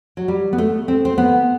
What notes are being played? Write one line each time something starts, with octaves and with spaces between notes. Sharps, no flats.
F#3
G3
B3
A3
C4
C4
B3